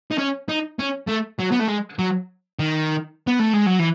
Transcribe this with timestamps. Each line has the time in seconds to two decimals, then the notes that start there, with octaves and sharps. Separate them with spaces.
0.11 D#4
0.18 C#4
0.49 D#4
0.79 C#4
1.08 A3
1.40 F#3
1.52 B3
1.61 A3
1.68 G#3
1.99 F#3
2.59 D#3
3.27 B3
3.39 A3
3.53 G#3
3.66 F#3
3.79 E3